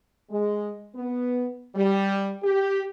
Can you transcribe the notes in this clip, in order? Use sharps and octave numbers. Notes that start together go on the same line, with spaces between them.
G#3
B3
G3
G4